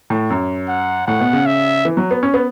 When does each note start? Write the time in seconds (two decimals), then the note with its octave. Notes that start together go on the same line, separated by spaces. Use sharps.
0.10 A2
0.30 F#2
0.68 F#5
1.07 A2 F#5
1.20 B2
1.33 C#3
1.46 E5
1.85 E3
1.97 F#3
2.11 B3
2.23 C#4
2.34 B3